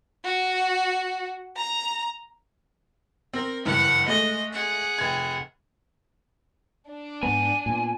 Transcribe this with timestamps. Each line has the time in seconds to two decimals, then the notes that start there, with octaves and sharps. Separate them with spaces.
0.24 F#4
1.56 A#5
3.33 C4 A#4
3.65 F#1 G2 E3 F#5
4.08 G#3 A3 D#5
4.53 G#4 F#5
4.98 F1 G#6
6.88 D4
7.23 G#2 B3 G#5
7.66 A#2 B3